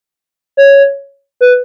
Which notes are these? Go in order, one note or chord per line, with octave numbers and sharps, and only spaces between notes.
C#5
B4